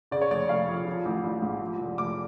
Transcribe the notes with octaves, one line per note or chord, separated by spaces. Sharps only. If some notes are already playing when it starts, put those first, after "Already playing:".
C#3 D5
C#5
F1 D5
F1 F5
F2
F3
A1
A1
G#2
F3
F1
F1 D6